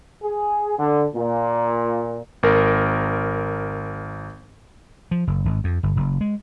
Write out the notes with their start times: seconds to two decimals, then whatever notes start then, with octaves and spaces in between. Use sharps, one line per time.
0.23 G#4
0.79 D3
1.15 A#2
2.43 G#1 A#4
5.11 F3
5.27 F#1
5.45 G#1
5.64 F2
5.83 G1
5.96 F#1
6.21 G#3